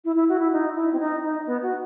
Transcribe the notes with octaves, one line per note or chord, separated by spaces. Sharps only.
E4
E4
F#4
E4
D#4
E4
C4
D#4
D#4
B3
F#4